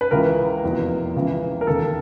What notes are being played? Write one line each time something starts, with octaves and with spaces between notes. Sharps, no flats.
B4
C#2 C#3 E3 A#4
F1 E2 B2
C#2 C#3 E3
A#4
E1 D#2 C#3 A4